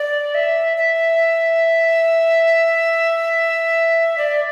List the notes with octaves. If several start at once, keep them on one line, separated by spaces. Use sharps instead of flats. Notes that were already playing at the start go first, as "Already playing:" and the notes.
Already playing: D5
E5
E5
D5